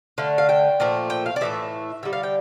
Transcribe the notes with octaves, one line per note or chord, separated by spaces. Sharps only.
D3 A3 F5
F5
G5
A#2 F3 A3
G5
F5
D5
A2 E3 A3 E5
D3 G3 E5
F5
G5